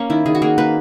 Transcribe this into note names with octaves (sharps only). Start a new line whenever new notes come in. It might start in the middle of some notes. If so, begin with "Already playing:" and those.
Already playing: A#3 C#4
D#3 E4
D#3 G#4
F#4
A#3 G#4
A#3 B4